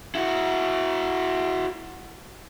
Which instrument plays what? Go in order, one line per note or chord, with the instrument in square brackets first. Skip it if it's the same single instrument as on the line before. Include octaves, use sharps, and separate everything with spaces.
[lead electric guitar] E4 F#4